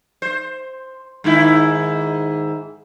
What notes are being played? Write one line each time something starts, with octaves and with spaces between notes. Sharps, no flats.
C5
G#2 D#3 E4